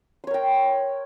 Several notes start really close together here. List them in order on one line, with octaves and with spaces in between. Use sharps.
C6 C#5 A#4 G5